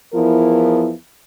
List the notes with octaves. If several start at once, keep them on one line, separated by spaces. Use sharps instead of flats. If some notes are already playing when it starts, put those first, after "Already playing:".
E2 F3 B3 E4 A#4